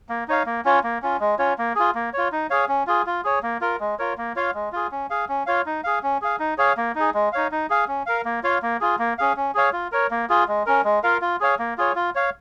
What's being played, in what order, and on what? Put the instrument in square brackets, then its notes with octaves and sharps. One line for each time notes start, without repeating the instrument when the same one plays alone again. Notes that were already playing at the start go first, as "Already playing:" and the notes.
[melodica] A#3
D#4 C#5 F5
A#3
C#4 F4 C#5
A#3
C#4 F4
G#3
C#4 F4 C#5
A#3
F4 G#4
A#3
F4 C#5
D#4
G#4 C#5 F5
C#4
F4 G#4
F4
G#4 C#5
A#3
F4 A#4
G#3
F4 A#4 C#5
A#3
F4 C#5 F5
G#3
F4 G#4
C#4
G#4 F5
C#4
F4 C#5 F5
D#4
G#4 F5
C#4
G#4 F5
D#4
G#4 C#5 F5
A#3
D#4 G#4
G#3
D#4 C#5 F5
D#4
G#4 F5
C#4
A#4 F5
A#3
F4 C#5 F5
A#3
F4 G#4
A#3
C#4 G#4 F5
C#4
G#4 C#5 F5
F4
A#4 C#5
A#3
F4 G#4
G#3
C#4 A#4
G#3
F4 A#4 F5
F4
G#4 C#5 F5
A#3
F4 G#4 C#5
F4
C#5 F5